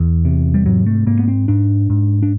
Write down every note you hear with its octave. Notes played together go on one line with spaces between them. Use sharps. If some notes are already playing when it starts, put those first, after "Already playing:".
Already playing: E2
C3
G3
G#2 F#3
A3
G#2 A#3
B3
C4
G#2 D4
G#2
D4